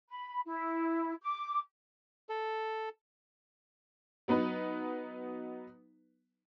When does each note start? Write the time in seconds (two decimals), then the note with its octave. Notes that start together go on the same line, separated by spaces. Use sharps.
0.09 B5
0.45 E4
1.22 D6
2.29 A4
4.28 F#3 B3 D#4 B4